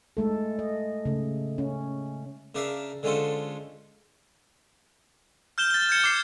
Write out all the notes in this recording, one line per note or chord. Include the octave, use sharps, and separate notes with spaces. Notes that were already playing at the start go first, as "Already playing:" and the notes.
G#3 A3 A4
D#5
C#3 A3
C#4
C#3 D4 A#4 D5 E5 F5
D3 G#3 C#4 F4 A4 C5
F6 G6 E7 G7
A6 G7
G6 G#6 C#7 E7
D6 C7